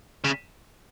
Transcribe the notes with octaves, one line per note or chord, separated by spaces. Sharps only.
C#3